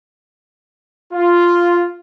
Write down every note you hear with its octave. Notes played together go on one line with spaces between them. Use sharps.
F4